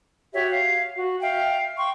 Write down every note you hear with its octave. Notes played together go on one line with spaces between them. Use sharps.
F#4 G4 C#5 E5
F5
F#4
E5 F5 G5
G5 C6 C#6